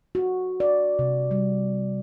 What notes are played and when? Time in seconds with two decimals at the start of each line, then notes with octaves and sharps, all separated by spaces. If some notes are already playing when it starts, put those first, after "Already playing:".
0.15 F#4
0.60 D5
0.99 C3
1.31 G3